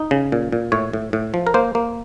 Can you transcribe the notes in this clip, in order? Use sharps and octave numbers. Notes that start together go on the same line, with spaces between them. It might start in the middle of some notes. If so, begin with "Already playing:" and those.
Already playing: D#4
C#3
A#2
A#2
A2 C#5
A2
A2
F3
A#4
A#3 C5
A#3